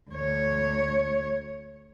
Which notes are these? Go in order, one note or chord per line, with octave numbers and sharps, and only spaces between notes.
D2 C#5